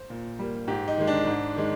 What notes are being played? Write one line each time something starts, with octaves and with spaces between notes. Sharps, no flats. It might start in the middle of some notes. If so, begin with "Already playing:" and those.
Already playing: C5
A#2
G3 A#3
G#2 G4
D#4
D#3 G#3
D4
G#2
D#3 G#3